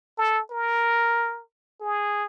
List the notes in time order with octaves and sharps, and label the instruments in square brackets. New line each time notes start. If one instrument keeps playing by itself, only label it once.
[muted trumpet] A4
A#4
G#4